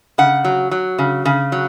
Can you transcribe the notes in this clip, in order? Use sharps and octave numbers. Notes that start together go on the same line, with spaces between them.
C#3 F#5
F#3
F#3
C#3
C#3
F#3